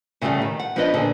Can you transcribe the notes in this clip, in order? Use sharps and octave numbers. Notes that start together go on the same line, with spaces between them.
A2 C#3 E3 F3 G3 A3
D#3
F#5
F3 B3 D4 B4 D#5
A#2 D3 G#4